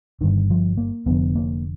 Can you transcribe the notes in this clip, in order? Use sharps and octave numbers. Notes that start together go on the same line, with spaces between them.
G1 G2 D3 D#3
F3
A#3
F1 F2 D3 B3
A#3